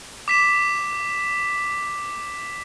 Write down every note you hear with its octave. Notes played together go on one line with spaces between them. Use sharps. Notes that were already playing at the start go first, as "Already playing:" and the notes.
D6 B6 E7